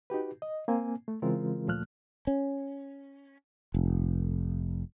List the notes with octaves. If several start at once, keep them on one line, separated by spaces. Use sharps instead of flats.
D#4 F#4 G4 B4
D#5
A#3 C4 G#5
A3
C#3 E3 G#3 C4 F4 A#4
D2 A#2 F3 A3 F6 F#6
C#4
F1